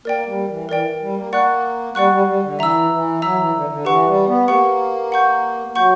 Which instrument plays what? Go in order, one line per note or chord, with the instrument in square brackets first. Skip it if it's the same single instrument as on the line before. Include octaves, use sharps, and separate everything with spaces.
[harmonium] A#3 [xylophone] A#4 D5 G5
[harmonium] G3
E3
[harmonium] E3 [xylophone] A#4 D5 G5
[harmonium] G3
A#3
[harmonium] A#3 [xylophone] D5 F#5 C#6 F#6
[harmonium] G3 [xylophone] D5 F#5 C#6 F#6
[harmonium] G3
G3
D3
[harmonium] E3 [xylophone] E5 A#5 E6
[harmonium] E3
[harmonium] F#3 [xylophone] E5 A#5 E6
[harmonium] E3
D3
D3
[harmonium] E3 [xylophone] G4 B4 F#5 C#6
[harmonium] G3
B3
[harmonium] A#3 [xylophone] G4 B4 F#5 C#6
[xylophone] F#5 C#6 G6
[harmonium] F#3 [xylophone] F#5 C#6 G6